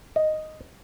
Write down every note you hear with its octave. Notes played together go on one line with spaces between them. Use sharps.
D#5